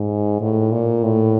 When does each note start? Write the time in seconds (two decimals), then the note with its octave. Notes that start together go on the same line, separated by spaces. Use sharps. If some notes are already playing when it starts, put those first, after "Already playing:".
Already playing: G#2
0.41 A2
0.72 A#2
1.03 A2